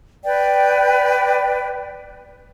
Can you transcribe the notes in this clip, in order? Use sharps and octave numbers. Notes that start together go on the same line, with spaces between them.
B4 D5 G5